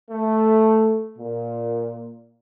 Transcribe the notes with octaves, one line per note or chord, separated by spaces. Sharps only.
A3
A#2